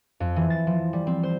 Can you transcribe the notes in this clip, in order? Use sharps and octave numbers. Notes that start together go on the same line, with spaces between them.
F2
E3
A6
F3
G3
C4
C5